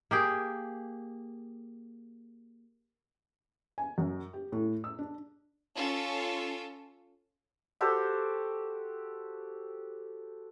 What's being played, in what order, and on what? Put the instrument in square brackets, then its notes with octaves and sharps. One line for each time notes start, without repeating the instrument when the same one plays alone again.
[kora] A#3 G4 G#4
[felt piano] G#5
F#2
G4
A2
E6
D4
[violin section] C#4 F4 A4
[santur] F#4 G4 A4 C5